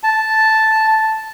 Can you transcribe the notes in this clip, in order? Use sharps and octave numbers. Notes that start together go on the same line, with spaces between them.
A5